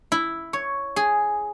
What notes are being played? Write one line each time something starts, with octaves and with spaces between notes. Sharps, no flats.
E4
C#5
G#4